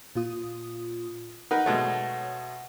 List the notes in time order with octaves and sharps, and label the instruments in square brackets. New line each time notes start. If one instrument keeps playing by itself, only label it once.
[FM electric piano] A#2 F4 D#6
[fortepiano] D#4 A#4 B4 [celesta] F#5
[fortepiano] B2 G#3 A3 [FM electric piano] C#5